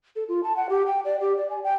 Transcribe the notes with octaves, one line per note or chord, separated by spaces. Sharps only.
A4
F4
A5
F#5
G4
G5
D5
G4
D5
G#5
G5